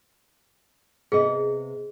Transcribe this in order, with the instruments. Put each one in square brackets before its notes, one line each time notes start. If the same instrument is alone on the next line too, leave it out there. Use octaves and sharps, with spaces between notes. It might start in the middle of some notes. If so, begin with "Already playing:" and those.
[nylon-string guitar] C3 B3 D#5 [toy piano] G#4